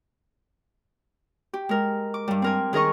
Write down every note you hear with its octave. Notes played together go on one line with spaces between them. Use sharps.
G4
G#3 A#4
D6
G2 G3
C4 A#4 G#5
D#3 G#4 A#4 D#5 C#6